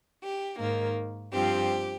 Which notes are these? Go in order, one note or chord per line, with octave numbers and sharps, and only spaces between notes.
G4
G#2 D#3 A#3
G2 F3 C4 G4